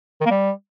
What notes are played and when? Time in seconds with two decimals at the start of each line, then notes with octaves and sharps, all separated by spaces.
0.21 D#3
0.26 A#3
0.31 G3